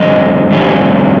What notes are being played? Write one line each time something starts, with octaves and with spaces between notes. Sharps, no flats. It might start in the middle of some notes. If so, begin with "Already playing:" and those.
Already playing: F2 D3 G3 D#5
F2 D3 G3